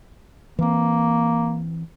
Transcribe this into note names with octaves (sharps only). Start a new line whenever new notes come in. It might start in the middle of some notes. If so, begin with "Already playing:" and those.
E3 A#3 C4